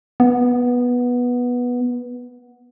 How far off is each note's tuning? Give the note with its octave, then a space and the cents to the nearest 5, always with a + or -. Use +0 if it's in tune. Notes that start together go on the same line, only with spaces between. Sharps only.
B3 -10